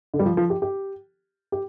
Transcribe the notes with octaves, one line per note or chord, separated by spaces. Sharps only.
D3
G3
F3
F3
G4
G4
G4